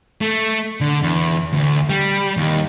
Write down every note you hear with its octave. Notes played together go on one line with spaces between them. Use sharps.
A3
D3
E2
D2
G3
D#2